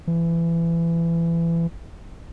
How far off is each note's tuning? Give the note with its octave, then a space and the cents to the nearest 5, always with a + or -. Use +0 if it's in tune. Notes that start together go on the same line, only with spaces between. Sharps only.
E3 +25